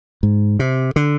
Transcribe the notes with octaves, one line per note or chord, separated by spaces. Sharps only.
G#2
C3
D3